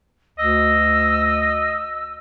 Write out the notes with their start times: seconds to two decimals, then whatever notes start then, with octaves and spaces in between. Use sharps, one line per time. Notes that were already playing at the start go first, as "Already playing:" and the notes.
0.39 D2 D#5 E6